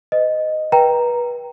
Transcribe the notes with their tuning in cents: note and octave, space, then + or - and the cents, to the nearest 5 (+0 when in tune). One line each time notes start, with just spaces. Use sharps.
B4 +45 D#5 -5
B4 -30 G5 +0 A#5 +0